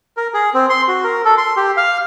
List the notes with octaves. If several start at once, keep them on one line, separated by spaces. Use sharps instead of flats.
A#4
G#4
C4
C6
F#4
A#4
A4
C6
G4
F5